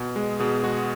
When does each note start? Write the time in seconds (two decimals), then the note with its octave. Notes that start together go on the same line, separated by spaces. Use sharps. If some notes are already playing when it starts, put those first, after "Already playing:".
Already playing: B2
0.16 G#3
0.40 B2 G#4
0.64 G#3 F#4